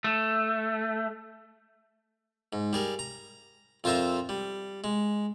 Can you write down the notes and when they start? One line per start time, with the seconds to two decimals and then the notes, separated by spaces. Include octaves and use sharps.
0.04 A3
2.53 G#2
2.73 G3 G#4 A#4
2.99 A#5
3.84 F2 F4 A#4 C5 E5 A#5
4.29 G3
4.84 G#3